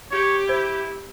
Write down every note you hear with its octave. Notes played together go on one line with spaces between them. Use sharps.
G4 C#5
E4 C5